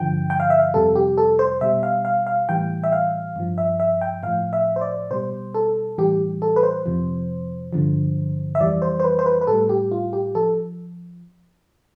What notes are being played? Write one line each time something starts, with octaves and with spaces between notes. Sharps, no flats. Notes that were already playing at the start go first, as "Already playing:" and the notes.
Already playing: G2 D3 F3 G5
G5
F5
E5
F5
F2 C3 G3 A4
G4
A4
C5
B2 G3 E5
F5
F5
F5
A2 E3 G3 G5
E5
F5
G2 F3
E5
E5
G5
A2 F3 F5
E5
C5
D5
B2 G3 C5
A4
A2 E3 G3 G4
A4
B4
C5
F2 C3 F3
G2 D3 F3
E5
F2 E3 G3 D5
C5
C5
B4
C5
B4
B4
A2 G3 A4
G4
F4
G4
F3 A4